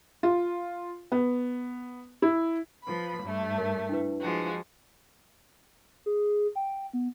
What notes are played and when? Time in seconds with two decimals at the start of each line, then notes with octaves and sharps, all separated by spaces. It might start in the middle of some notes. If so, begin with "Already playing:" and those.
0.23 F4
1.12 B3
2.22 E4
2.83 F3 B4 B5
3.22 G2 A3
3.58 A#4
3.89 D4 E4 B4
4.21 F3 G#3 F#4
6.06 G#4
6.55 G5
6.93 B3